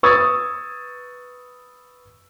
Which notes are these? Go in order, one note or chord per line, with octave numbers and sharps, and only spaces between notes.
B4 C#6 D#6 E6 G#6 A6